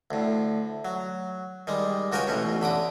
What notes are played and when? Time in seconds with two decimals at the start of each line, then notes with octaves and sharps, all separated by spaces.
0.11 D2 A2
0.85 F#3
1.67 D#3 G3 G#3
2.12 C#2 F#4 A#4 C#5 G5 G#5
2.27 A1 B2 C#4
2.62 D3 B5 D6 D#6